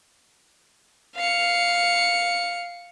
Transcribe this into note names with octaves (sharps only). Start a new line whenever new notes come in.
F5 C#7